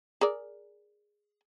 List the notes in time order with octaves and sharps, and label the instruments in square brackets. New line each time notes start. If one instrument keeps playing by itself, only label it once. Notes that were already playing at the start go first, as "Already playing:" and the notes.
[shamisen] G#4 A#4 D5